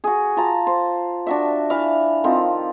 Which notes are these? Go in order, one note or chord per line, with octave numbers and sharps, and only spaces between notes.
F#4 G#4
F4 A5 A#5
C5
D4 F#4 E5
E3 B4 E5 F5
D#3 F3 C4